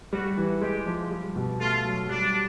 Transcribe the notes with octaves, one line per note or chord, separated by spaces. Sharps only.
G3 F#4
E3
G#3 G4
F3
G3
B2
A3 F4
F#3
G3 D4